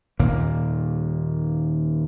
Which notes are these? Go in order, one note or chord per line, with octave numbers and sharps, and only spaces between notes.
D#2 A#2 A#3